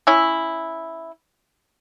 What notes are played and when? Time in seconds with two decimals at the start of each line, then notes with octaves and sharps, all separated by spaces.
0.07 C#4 E4